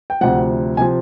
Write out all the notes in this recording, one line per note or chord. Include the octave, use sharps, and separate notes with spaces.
G5
D2 C3 F3 F#5
C3 F3 G#5